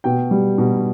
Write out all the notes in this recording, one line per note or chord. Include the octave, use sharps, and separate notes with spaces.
B2 G5
G3
B2